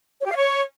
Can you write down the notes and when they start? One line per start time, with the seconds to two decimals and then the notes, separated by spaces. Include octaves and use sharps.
0.20 C#5
0.25 G4
0.31 F5
0.36 C#5